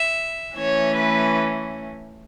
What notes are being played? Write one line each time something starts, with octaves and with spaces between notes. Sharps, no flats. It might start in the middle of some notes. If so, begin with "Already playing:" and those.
Already playing: E5
E3 A3 C#4 C#5
B4